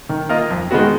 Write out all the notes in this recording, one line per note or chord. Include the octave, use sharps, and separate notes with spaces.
D#3
A#3 F4 A#4 D#5
F2
D#3 G#3 B3 F#4